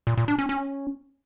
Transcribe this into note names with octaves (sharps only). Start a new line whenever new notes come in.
A#2
A#2
D4
C#4
C#4